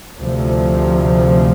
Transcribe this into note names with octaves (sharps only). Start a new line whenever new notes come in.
D2 C3 F3